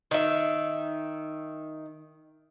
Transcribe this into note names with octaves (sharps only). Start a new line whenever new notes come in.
D#3 E5